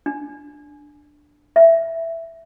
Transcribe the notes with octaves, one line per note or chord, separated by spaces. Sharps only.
D4
E5